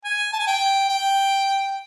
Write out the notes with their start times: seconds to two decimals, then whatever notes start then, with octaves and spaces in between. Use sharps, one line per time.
0.04 G#5
0.33 A5
0.39 G#5
0.47 G5
0.89 G5